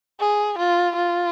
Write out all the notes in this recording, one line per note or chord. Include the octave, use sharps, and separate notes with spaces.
G#4
F4
F4